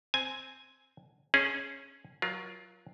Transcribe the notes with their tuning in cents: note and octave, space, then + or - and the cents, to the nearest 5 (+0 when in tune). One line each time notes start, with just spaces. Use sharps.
C4 +0 G#5 +0
C#4 -15 G#4 +0
F#3 +0 F4 +0 A#4 +30